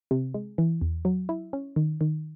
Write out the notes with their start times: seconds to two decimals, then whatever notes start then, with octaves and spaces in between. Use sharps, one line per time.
0.11 C3
0.34 G#3
0.58 E3
0.81 E2
1.05 F#3
1.29 E4
1.53 C#4
1.76 D#3
2.01 D#3